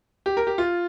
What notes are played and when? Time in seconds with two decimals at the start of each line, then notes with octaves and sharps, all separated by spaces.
0.26 G4
0.37 A#4
0.47 G4
0.58 F4